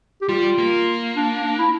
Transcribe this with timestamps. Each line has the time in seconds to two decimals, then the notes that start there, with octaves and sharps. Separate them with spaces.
0.22 G4
0.29 G3 F4
0.58 A#3
1.16 D4
1.44 D4
1.59 E4